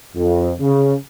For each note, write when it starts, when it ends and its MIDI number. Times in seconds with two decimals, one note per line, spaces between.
0.16 0.52 41
0.60 0.94 49